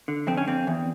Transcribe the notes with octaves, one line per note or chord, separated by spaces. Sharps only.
D3
F2 C4
C#4
F2 C4
E2